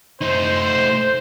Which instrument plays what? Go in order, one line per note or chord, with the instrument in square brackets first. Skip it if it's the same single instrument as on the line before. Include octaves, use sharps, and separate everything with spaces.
[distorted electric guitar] A3 D#4 [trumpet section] C5